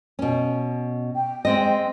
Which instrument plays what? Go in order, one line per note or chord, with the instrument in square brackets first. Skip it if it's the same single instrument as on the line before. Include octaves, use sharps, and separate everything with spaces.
[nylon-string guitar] B2 C#4
[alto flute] G5
[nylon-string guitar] G#3 C4 D#5